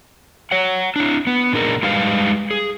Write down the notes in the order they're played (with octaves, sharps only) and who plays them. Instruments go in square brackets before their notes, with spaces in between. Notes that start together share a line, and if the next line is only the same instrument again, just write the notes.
[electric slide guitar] C#5 F#5
D4 E4
B3
A#2 D4 D#4 G#4 A#4
G3 G#3 D#4 G4 B4 F5
G#4